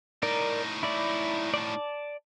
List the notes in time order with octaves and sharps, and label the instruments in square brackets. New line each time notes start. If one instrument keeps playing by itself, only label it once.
[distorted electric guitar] A2 D#4 [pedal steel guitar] A#4 D5
[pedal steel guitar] E4 D5
D5 A5